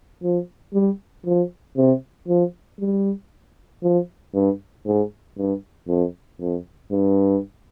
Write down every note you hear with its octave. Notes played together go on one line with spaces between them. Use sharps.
F3
G3
F3
C3
F3
G3
F3
G2
G#2
G2
F2
F2
G2